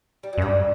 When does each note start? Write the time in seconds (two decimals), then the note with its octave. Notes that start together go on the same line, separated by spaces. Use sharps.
0.23 G3
0.33 F#3
0.38 F#2
0.42 G2 G3